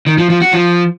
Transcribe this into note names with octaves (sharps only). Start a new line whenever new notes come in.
D#3
F3
F3
F#4
F3